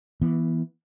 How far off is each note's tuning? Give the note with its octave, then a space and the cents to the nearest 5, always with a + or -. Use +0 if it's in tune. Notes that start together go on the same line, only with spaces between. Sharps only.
E3 +0 B3 -25